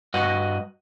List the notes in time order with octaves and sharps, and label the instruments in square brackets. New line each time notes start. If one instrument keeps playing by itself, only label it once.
[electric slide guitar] G2 F#4 B4 D#5 F#5